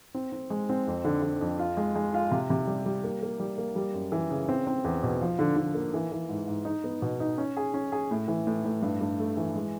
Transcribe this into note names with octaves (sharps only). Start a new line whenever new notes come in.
C4
C4
G#3
C4
F2
D3
D3
F2
F4
G#3
G#3
F4
C3
C3
G3
G3
A#3
A#3
G3
A#3
G3
F#2
E3
C#3
C4
C4
E2
B2
F3
D3
D3
A#3
E3
E3
G#2
G#2
D#4
B3
B2
D#4
C#4
G#4
C#4
G#4
A2
E3
A2
A2
G2
G2
A3
E3
G#3